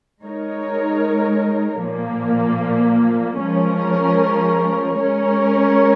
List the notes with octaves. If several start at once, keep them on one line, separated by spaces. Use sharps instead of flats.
G#3 D#4 A#4 C#5
A#2 F3 A#3
F3 G#3 C#4 A#4
G#3 C#4 A#4 C#5